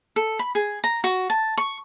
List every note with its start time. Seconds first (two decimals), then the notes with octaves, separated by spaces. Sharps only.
0.16 A4
0.39 B5
0.55 G#4
0.84 A#5
1.04 F#4
1.30 A5
1.58 C#6